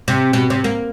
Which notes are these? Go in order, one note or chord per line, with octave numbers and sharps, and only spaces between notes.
C3
B2
C3
A#3